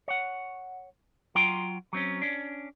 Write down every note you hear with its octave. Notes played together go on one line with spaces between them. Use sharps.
C#5 F#5
F#3 F4 G5 A#5 C6
F#3 C4 C#4
C#4 D4